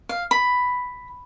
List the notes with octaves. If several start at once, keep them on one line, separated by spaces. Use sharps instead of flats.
F5
B5